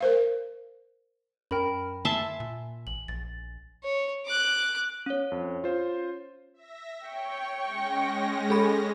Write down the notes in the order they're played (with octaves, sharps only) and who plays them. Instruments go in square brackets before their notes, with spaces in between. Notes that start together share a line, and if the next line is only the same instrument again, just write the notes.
[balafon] A#4 C5 F5
[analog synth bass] F#2 [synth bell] C#4 A#4 F6 [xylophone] G5 B5
[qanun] E5 A5 C6 [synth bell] G#5
[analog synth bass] A#2
[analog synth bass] A1 [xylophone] F#7
[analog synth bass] A#1 [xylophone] A6
[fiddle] C#5
D6 F#6
[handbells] C#4 C#5
[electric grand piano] F2
F4 C5
[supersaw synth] E5 A#6
[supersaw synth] C#5 [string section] G5 C#6
[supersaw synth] G#3 C#4 A#6
[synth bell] G#4 A4 B5